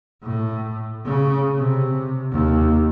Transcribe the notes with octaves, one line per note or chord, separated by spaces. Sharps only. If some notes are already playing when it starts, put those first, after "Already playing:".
A2
C#3
C3
D#2